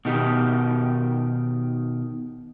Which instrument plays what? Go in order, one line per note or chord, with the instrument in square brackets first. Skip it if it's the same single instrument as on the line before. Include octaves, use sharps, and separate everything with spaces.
[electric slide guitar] B2 D#3 G4